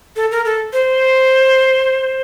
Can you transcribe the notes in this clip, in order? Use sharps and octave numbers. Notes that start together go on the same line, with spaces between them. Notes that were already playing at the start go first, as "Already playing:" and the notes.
A4
A#4
A4
C5